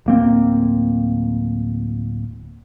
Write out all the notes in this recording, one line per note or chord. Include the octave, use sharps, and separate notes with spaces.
D1 A#3 C4